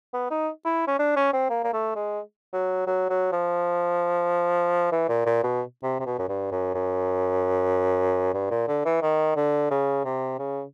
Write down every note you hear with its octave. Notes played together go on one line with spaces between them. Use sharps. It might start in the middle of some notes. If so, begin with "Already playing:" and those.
B3
D#4
E4
C#4
D4
C#4
C4
A#3
A#3
A3
G#3
F#3
F#3
F#3
F3
E3
A#2
A#2
B2
C3
C3
B2
F#2
G2
F#2
F#2
G2
A#2
D3
E3
D#3
D3
C#3
C3
C#3